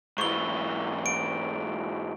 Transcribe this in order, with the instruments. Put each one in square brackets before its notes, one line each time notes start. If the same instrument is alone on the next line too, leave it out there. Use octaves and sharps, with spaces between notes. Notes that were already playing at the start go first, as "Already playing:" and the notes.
[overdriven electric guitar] G#2 E3 [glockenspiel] C#6 G7
[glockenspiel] D7